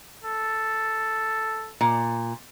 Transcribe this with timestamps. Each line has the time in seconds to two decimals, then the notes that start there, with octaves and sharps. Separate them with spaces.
0.24 A4
1.81 A#2